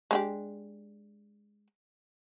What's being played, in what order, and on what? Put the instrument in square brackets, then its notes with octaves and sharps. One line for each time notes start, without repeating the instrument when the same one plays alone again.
[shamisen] G#3 D4 G4